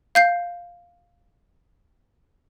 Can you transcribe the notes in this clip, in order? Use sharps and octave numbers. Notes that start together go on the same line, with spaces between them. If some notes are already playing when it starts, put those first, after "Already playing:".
F5 G6 C7